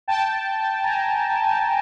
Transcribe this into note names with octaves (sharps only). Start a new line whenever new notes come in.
G5 A5
G#5 A#5